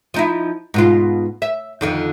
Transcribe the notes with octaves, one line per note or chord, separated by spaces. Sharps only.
F3 D#4 E4
G#2 B2 F4
E5
F2 D3 D#3